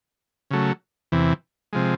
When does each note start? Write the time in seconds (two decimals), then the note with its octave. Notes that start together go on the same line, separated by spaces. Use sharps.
0.51 C#3 F#3 A3
1.12 E2 C3 E3
1.73 C3 F3 G#3